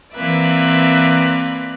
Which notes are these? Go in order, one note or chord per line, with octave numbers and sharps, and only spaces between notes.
E3 A#3 C4 B4 D5 E5